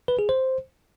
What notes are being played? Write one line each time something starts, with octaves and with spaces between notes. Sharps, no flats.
B4
G#4
C5